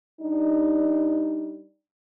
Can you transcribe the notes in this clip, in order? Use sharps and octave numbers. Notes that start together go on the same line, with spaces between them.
G3 D4 D#4